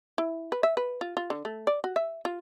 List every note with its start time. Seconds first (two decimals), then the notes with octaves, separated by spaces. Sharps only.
0.18 E4
0.52 B4
0.63 E5
0.77 B4
1.01 F4
1.17 F4
1.30 D3
1.45 A3
1.67 D5
1.84 F#4
1.96 E5
2.25 F4